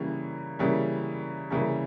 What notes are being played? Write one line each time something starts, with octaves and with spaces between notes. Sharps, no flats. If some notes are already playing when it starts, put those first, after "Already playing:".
Already playing: C#3 E3 G3 A#3 C#4
C#3 E3 G3 A#3 C#4
C#3 E3 G3 A#3 C#4